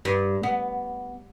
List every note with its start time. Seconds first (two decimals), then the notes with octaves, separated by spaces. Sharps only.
0.05 G2
0.43 B3